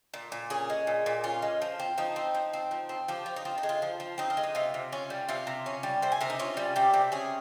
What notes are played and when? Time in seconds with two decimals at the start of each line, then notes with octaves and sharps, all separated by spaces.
0.14 A#2
0.32 A#2
0.50 C#4 G#4
0.70 G#3
0.87 A#2
1.06 A#2
1.24 C#4 F4
1.42 G#3
1.62 F3
1.79 C4
1.98 F3 D#4
2.16 C4
2.35 F3
2.53 C4
2.71 F3
2.89 C4
3.08 F3 G4
3.26 F3
3.36 D#4
3.45 C4 F4
3.58 D#4
3.63 G#3
3.69 F4
3.82 F3
4.00 F3
4.18 C4 D#4
4.30 F4
4.37 G#3
4.43 D#4
4.55 C3 F4
4.74 C3
4.92 C#4 F4
5.10 G3
5.29 C3 F4
5.47 C3
5.66 C#4
5.83 G3
6.02 C3 C5
6.12 G#5
6.21 C3 A#4
6.30 D#4
6.39 C#4 F4
6.57 G3
6.76 C3 G4
6.94 C3
7.12 C#4 G#4